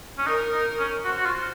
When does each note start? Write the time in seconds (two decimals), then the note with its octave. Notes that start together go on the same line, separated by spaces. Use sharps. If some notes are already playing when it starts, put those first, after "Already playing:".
0.18 C#4
0.26 D#4 A#4
0.52 D#4
0.79 C#4
1.05 F#4 C5
1.16 F#4
1.26 F4